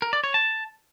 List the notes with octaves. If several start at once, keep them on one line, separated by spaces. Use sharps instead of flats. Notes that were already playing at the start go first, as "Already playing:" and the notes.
A#4
D5
C#5
A5